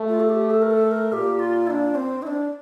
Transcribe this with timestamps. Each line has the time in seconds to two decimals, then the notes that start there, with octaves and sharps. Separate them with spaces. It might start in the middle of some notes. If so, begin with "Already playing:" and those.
Already playing: A3
0.08 F4
0.20 A4
0.30 G4
0.50 A4
0.62 A#4
0.70 A4
0.91 A#4
1.12 A#2 G4
1.39 F4
1.67 E4
1.70 D4
1.95 C4
2.22 E4
2.27 D4